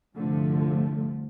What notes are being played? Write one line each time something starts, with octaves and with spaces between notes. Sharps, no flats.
C2 G2 D3 F3 A3